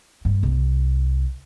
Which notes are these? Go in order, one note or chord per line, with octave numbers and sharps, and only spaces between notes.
G2
C2